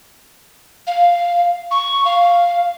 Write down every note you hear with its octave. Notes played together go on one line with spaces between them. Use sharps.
F5
C#6
F5